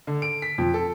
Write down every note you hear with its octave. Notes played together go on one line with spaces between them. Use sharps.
D3
D7
B6
F2
A4